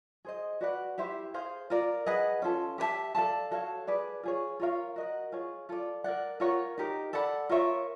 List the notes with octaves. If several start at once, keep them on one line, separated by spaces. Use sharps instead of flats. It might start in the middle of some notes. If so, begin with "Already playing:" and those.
G#4 C5 D#5
F#4 B4 D5 F#5
E4 G4 C5 E5
G#4 C5 F5
F4 A#4 D5
G#4 B4 D#5 F#5
C#4 F4 A4
G4 B4 E5 A5
A4 D5 F5 A5
F#4 A4 C#5 F5
G#4 B4 D5
F4 G#4 C#5
F4 A#4 C#5 F5
F#4 A#4 D#5 F#5
F4 G#4 C#5
F4 A4 D5
A#4 D5 F#5
F4 A#4 C#5 F#5
D#4 G4 A#4
A4 D5 F#5 B5
F4 A#4 C#5 E5